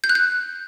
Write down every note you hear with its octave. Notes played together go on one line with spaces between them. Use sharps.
G6
F#6
G6